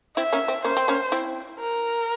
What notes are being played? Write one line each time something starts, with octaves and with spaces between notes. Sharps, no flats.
C4 E4 E5
A#3 C#4
C4
A#3 C#4 C5
C4
A#3 C#4
C4 E4
A#4